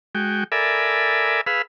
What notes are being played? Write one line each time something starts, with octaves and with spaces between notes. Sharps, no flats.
G#3 F#4 G5
A4 A#4 D5 E5 G#5 B5
G#4 B4 F5 B5 E6